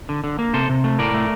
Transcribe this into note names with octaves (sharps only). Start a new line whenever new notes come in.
D3
D3
A#3
C3 A4 C5
C3
A3
A2 A#4 D5
A3